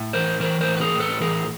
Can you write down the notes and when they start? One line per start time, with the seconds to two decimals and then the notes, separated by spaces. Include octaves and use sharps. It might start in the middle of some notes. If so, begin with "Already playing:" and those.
Already playing: A2
0.13 E3 A#4 C5
0.40 E3 A#4 C5
0.61 A#4 C5
0.68 A2
0.77 B4
0.81 G#4 A#4
0.94 A2
1.00 A4 B4
1.21 E3 G#4 A#4